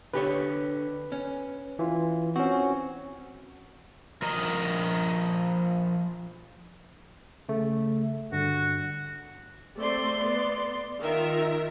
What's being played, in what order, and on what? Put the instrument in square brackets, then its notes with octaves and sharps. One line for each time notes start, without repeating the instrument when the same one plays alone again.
[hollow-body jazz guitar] D3 G4 C#5 [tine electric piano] B4
[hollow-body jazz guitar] C#4
[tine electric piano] E3 F4
[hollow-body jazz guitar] C4 [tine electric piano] C#4 F#4
[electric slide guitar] F3 A#4 D#5 A#5
[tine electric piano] C#3 A3
[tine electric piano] G2 D3 [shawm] F#4
[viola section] A3 C4 D5 C6
B3 D5 C6
D#3 F4 A#4 E5